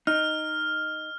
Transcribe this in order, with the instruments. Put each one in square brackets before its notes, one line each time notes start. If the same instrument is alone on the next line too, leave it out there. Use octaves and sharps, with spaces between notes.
[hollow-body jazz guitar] D#4 [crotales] F6